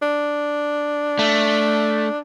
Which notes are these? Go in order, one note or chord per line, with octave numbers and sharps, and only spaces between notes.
D4
A3